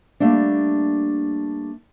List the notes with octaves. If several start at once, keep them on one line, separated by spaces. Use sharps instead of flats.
G3 A3 A#3 D4